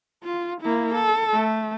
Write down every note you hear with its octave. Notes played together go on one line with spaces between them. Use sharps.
F4
A#3 E4
A4
A3